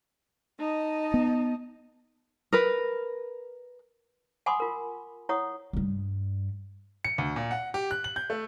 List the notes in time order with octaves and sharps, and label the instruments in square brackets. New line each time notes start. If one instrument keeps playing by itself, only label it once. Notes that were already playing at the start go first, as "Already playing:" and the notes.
[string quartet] D#4 D#5 A5
[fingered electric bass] B3
[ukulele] A#4 B4
[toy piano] F#5 G#5 B5 C6 D6 D#6
F4 A#4
E4 C#5 F#5 C#6 D#6
[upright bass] G2 G3
[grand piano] C#7
D2
A#2
F#5
G4
F#6
F#7
G6
A3